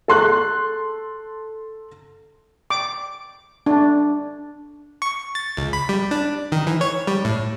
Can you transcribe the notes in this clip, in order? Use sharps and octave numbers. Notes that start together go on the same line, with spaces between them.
A4 C6 F#6
D6
D4
C#6
A6
C#2
B5
G3
D4
D#3
E3
C#5
G3
A2